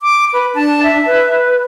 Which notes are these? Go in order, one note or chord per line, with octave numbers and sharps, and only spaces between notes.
D6
B4
D4 A5
E5
B4